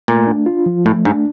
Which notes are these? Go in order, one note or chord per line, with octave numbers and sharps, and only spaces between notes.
A#2 A3
D4
F4
F3
A2 A3
G#2 D4